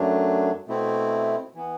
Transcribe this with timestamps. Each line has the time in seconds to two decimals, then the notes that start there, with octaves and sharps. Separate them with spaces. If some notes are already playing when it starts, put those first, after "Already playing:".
Already playing: F#2 F#3 A3 D4
0.67 B2 A3 C4 E4
1.55 E3 B3